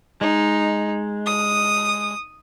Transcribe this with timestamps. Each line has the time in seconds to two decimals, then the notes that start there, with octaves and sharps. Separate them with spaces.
0.21 G#3 D#4
1.26 D#6